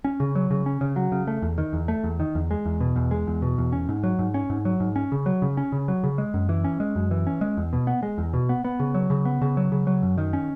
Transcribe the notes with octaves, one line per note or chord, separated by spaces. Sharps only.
C#4
C#3
F#3
C#3
C#4
C#3
F#3
C#3
A3
E2
D#3
E2
A3
E2
D#3
E2
G#3
E2
B2
E2
G#3
E2
B2
E2
C#4
G#2
F#3
G#2
C#4
G#2
F#3
G#2
C#4
C#3
F#3
C#3
C#4
C#3
F#3
C#3
G#3
F#2
E3
C#4
G#3
F#2
E3
C#4
G#3
E2
B2
B3
G#3
E2
B2
B3
B3
C#3
F#3
C#3
B3
C#3
F#3
C#3
F#3
F#2
D#3
C#4